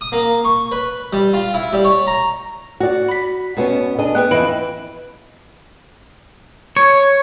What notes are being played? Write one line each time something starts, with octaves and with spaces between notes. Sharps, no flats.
D#6
A#3
C#6
B4
G3
F4
E4
G3
C#5
A#5
F#4 D5
B5 B6
B2 B3 C#4
D4 G#4 D#5
B3 B4 G5 F#6
F2 E3 D#5 B5 D7
C#5